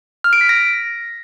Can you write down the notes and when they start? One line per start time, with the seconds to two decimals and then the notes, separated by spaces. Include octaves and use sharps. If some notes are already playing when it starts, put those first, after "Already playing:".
0.24 F6
0.33 D7
0.41 B6
0.49 A#6